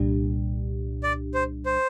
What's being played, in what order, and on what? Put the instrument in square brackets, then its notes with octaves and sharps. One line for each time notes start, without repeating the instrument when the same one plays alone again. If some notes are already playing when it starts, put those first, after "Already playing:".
Already playing: [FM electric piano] C2 A#2 G3 D4 G4
[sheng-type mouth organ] D5
C5
C5